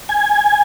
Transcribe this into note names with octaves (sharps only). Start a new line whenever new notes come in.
G#5